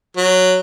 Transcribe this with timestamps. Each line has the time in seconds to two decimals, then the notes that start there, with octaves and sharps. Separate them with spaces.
0.17 F#3